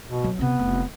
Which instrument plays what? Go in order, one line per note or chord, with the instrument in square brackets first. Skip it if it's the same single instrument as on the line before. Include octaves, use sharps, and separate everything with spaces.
[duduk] B2
[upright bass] F#3
[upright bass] C3 C4 [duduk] B3
[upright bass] F1